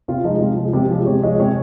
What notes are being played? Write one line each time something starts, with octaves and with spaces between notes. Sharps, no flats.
C3 F4
F3 G#3 D#4
C3 F4
F3 G#3
G#4
C3 G4
F3 G#3
C3 C#5
F3 G#3 D#5
C3 C#5